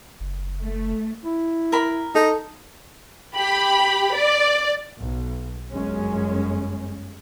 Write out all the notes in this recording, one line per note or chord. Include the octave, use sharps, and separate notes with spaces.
F#1
A3
E4
A#4 B5
D#4 A4
G4 B5
D5
B1
G1 F#2 G#3 C#4